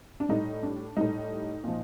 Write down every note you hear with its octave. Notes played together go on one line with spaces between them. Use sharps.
D4
A2 G3 D#4
D4
A2 G3 D#4
A#2 F3